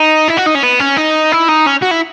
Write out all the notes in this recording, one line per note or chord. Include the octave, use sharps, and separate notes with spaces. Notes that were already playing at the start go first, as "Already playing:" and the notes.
Already playing: D#4
E4
F#4
D#4
C#4
B3
C#4
D#4
E4
D#4
C#4
F#4
E4